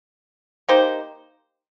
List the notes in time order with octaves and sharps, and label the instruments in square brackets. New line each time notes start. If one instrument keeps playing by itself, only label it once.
[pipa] A#3 D#4 G4 C5